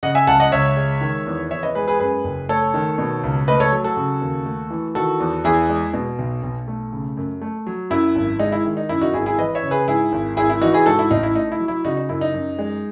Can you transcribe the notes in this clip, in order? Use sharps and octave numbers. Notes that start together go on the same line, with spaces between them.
C#3 D#5 F#5
E5 G#5
C#2 F#5 A5
D#5 F#5
C#2 C#5 E5
G#3
D#3
E2
E2 C#5 E5
B4 D#5
G#3 G#4 B4
G#4 B4
F#2 G#4 B4
F#1
A3 A4 C#5
D#3
B2
C#2
A3 B4 D#5
A4 C#5
F#3
F#4 A4
C#3
D#2
A3
E3
D#3 F#4 A4
E2
E2 E4 G#4
G#3
B2
B1
B1
A3
C#3
F#2
A3
F#3
F#2 E4
G#1
G#3 D#4
E4
D#3
D#4
F#2 E4
D#4 F#4
G#1 E4 G#4
E4 G#4
E3 B4 D#5
C#5 E5
C#3
G#4 B4
G#2 E4 G#4
G#1
G#1 E4 G#4
E4
E3 D#4 F#4
E4 G#4
G#2 F#4 A4
E4
A1 D#4
E4
A3 D#4
E4
F#3
E4
C#3 D#4 F#4
D#4
F#2 E4
D#4
F#2
G#3